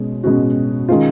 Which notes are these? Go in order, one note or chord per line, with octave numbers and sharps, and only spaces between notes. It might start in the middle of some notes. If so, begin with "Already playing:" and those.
Already playing: B2 G#3 C#4
B2 G#3 C#4 F#4
D#3 G#3 C#4 F4